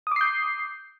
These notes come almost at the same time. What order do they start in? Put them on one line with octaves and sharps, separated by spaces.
D#6 D6 C7 G6